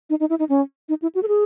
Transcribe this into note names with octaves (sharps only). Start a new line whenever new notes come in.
D#4
D#4
E4
D#4
C#4
D#4
E4
F#4
A4
G#4